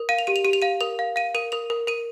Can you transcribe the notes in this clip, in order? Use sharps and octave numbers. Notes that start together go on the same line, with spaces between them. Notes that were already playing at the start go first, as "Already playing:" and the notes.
Already playing: A#4
F5 D#7
F7
G4 D#7
F7
G4 D#7
F7
F5 D#7
A#4 F7
F5
F5 D#7
A#4 D#7
A#4 F7
A#4
A#4 D#7